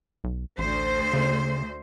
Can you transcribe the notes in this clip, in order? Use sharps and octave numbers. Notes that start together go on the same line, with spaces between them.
B1
A1 D2 C5
C#3